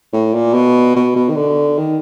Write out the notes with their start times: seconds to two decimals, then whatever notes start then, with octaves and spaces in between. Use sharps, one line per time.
0.13 A2
0.34 A#2
0.54 B2
0.96 B2
1.16 B2
1.29 D#3
1.36 D3
1.78 D#3